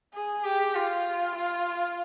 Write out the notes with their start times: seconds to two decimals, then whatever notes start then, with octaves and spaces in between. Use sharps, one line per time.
0.14 G#4
0.44 G4
0.75 F4
1.35 F4